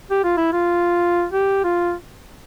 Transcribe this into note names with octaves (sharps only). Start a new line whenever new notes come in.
G4
F4
E4
F4
G4
F4